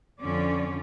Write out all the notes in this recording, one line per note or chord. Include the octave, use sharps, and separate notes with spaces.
F2 D3 F3 C#4 D5